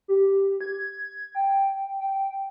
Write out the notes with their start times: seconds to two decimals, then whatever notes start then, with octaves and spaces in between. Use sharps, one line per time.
0.08 G4
0.61 G#6
1.35 G5
2.00 G5